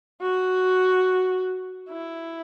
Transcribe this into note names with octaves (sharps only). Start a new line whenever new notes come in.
F#4
E4